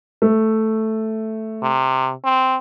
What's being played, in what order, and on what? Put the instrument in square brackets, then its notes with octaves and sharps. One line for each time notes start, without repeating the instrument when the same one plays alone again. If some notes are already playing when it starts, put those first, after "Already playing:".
[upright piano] A3
[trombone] C3
C4